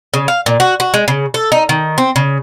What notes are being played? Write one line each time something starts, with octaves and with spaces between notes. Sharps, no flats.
C#3
F5
A#2
F#4
F#4
G#3
C#3
A4
D#4
D#3
C4
C#3